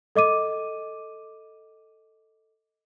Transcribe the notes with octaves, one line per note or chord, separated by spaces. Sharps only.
A4 D#5 D6 D#7